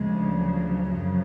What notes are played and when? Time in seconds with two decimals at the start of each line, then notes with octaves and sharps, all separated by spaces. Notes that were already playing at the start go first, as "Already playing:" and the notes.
Already playing: D2 C#3 F3 G#3
0.38 F#3
0.90 F#2 C#3 F3